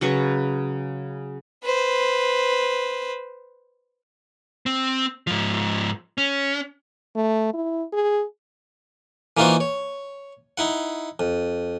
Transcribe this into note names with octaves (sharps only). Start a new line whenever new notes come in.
C#3 F#3 B4 C#6
B4 C5
C4
G#2 F3
C#4
A3
E4
G#4
E3 A#3 D#4 F4 F#4 C5
C#5
D#4 E4 F#5
F2